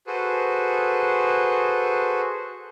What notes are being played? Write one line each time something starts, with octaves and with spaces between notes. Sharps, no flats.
F#4 G#4 A4 B4 C5